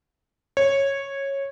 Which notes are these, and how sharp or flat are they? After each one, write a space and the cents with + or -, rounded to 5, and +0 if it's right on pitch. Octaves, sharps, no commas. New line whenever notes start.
C#5 -10